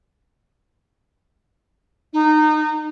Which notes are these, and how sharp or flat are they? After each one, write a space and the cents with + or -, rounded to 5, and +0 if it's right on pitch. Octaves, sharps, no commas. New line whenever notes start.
D#4 -25